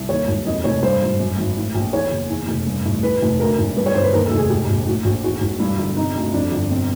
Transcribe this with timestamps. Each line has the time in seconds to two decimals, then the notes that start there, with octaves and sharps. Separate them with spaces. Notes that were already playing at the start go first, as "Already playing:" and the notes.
Already playing: C2
0.09 D#2 C#5
0.28 E1
0.46 F2 D#5
0.64 F1 C#5
0.82 G2 C5
1.01 G#1
1.20 F#2
1.38 G#1
1.57 A2
1.75 A#1
1.93 E2 C#5
2.11 F#1
2.30 E2
2.48 F1
2.67 G2
2.85 A1
3.03 E2 B4
3.22 F1
3.40 D2 A#4
3.59 E1
3.76 G2 B4
3.86 C#5
3.95 G1 C5
4.04 B4
4.13 D#2 A#4
4.26 A4
4.31 F1
4.38 G#4
4.50 G#2 G4
4.69 A#1
4.86 A2 F#4
5.05 A#1 F#4
5.24 E2 F#4
5.41 E1
5.60 G2 E4
5.78 G1
5.97 C3 D#4
6.16 D2
6.34 F2 D4
6.52 G1
6.71 B2 C4